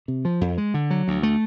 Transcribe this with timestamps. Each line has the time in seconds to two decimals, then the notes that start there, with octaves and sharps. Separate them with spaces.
0.08 C3
0.25 F3
0.41 F2
0.58 G#3
0.74 D3
0.90 F#3
1.08 D2
1.23 A3